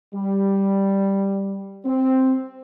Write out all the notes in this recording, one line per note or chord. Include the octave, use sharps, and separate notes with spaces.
G3
C4